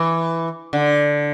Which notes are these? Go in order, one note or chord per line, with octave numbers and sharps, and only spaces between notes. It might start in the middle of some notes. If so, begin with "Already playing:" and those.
Already playing: E3
D3